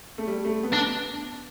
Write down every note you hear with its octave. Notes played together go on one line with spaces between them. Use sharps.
A3
G3
A3
B3
D4